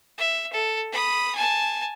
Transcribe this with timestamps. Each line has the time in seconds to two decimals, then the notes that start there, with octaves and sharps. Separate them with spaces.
0.18 E5
0.53 A4
0.92 B5 D#6
1.35 G#5 A5